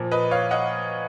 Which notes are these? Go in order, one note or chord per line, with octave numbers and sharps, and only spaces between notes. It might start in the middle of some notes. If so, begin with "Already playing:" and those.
Already playing: A#2 F3
B4 D#5
C#5 F5
D#5 F#5